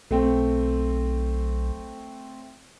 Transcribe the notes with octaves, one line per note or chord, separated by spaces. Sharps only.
B1 A3 C4